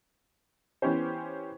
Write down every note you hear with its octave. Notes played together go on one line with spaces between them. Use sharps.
E3 B3 C#4 G4 C5